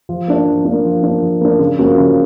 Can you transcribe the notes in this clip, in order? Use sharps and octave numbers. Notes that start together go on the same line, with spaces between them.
F3
A#3 D4
F3
A#3 D4
F3
A#3 D4
F3
A#3 D4
C#3
F3 A#3 C#4 F#4
C#3